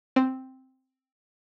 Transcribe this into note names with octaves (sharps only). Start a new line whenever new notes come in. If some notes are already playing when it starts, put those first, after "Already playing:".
C4